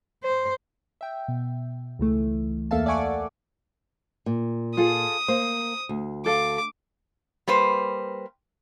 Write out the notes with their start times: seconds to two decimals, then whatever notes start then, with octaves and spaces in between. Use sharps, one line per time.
0.23 C5
1.01 E5 G5
1.28 B2
1.99 C#2 E3 A3
2.71 E2 A#3 A4 E5 F5 A5
2.86 D5 E5 F#5 G#5 C#6 D6
4.26 A#2
4.77 F4 G#4 A4 D#6
5.28 A#3 C5
5.89 D2
6.26 A4 F5 D6
7.47 G3 A#3 B4 C5